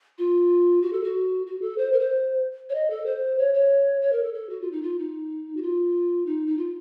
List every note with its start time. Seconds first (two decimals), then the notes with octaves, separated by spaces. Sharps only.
0.18 F4
0.82 F#4
0.93 A4
1.04 F#4
1.47 F#4
1.62 A4
1.78 C5
1.93 A#4
2.00 C5
2.70 C#5
2.75 D#5
2.90 A4
3.06 C5
3.38 C#5
3.54 C#5
4.02 C#5
4.12 A#4
4.23 A4
4.34 A4
4.50 F#4
4.61 F4
4.72 D#4
4.83 F4
4.99 D#4
5.56 F#4
5.62 F4
6.26 D#4
6.47 D#4
6.58 F4